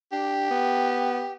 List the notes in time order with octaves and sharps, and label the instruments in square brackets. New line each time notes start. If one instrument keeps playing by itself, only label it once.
[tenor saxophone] D4 [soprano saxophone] G4
[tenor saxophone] B3